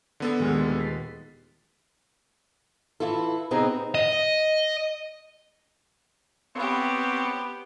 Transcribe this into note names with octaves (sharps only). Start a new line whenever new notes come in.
D3 B3 A4
D#1 G#3 F6
A6 B6 C7
E3 E4 F4 A4
C3 B3 C4 D#4 G#4 A#5
D#5
B3 C4 G4 C#5